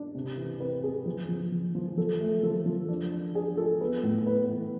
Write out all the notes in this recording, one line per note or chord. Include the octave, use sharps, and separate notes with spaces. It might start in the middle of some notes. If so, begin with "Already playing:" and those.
Already playing: D4
C3
E3
C4 B4
C4 G#4
F3
F3
F3
F3
F3 A4
A3
F3 A4
F3
D4
D4
D4 G#4
F4 A4
B3 B4
A2
B3 B4
E3